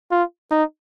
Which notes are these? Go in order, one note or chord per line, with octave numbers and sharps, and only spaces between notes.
F4
D#4